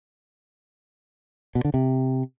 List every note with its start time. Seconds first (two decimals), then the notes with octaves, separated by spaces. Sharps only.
1.55 B2
1.65 D3
1.74 C3